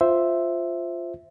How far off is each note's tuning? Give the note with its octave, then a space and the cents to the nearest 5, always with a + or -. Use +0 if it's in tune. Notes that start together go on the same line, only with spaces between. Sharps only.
F4 +0 C5 +0 E5 +0